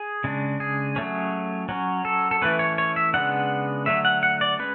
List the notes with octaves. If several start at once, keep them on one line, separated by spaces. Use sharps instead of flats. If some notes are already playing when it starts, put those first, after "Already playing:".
Already playing: G#4
C#3 G#3 D4
G#4
F#3 A3 C#4
F#3 C#4
A4
A4
E3 A3 C#4 B4
C#5
C#5
E5
C#3 G#3 B3 D4 F#5
D3 F#3 A3 E5
F#5
F#5
D5
G#3 C#4 B4